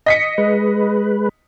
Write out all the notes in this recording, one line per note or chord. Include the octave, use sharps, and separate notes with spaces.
D#5 B6 C#7
G#3 B4